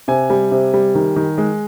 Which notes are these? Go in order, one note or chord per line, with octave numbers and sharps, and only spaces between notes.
C3 G#5
G3
C3
G3
D#3
D#3
G#3